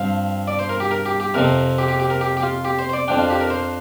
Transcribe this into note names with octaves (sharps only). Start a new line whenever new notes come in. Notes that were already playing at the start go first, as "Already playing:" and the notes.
Already playing: G2 F3 C4 F5
D5
C5
A#4
G4
A#4
G4
G4
F2 C3 F3 C4 A#4
G4
G4
G4
A#4
G4
G4
F4
G4
C5
C5
D5
F2 F3 D4 G5
F4
G4
A#4
C5